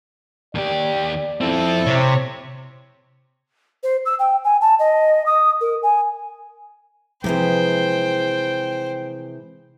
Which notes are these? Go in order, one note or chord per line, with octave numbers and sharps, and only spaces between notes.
D#2 G4 D5
F2 C4 E4 A4
C3 C5 C#5
C5
E6
G5
G#5
A5
D#5
D#6
A#4
G#5
C3 E3 F3 G#3 G#4 C5 G5